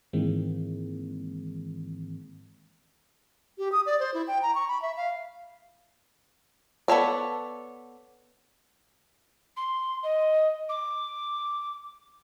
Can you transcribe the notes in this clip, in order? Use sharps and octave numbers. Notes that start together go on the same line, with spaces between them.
G#2 D#3 E3 G#3 A#3 C4
G4
D#6
D5
C5
E4
G5
A#5
C#6
B5
E5
F5
B3 A4 C#5 D5
C6
D#5
D6